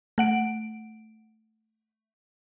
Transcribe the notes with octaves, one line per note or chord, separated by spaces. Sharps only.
A3 F#5 D7